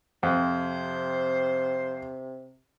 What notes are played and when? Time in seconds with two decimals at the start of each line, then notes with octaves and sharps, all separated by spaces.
0.23 F2 C3 C5